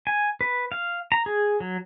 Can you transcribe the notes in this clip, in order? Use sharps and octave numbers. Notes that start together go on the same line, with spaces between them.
G#5
B4
F5
A#5
G#4
F#3